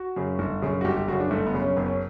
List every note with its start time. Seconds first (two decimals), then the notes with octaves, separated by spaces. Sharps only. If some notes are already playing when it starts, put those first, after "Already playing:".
Already playing: F#4
0.16 F#2 C#3
0.39 G1
0.62 F#2 C#3
0.81 F#4
0.85 G1 G4
0.97 G4
1.08 F#2 F#4
1.12 C#3
1.20 D4
1.31 G1 A3
1.46 B3
1.54 F#2 C#3
1.62 C#4
1.76 F#1 B3
1.86 C#4